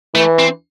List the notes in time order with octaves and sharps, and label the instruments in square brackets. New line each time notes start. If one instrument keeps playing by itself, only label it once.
[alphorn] E3 [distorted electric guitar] A3
[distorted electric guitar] C4